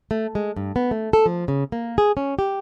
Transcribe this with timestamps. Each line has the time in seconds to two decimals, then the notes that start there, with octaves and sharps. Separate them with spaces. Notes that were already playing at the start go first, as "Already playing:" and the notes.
0.11 A3
0.35 G#3
0.56 G2
0.76 B3
0.91 A3
1.13 A4
1.26 F3
1.48 C#3
1.72 A#3
1.98 G#4
2.17 C#4
2.39 G4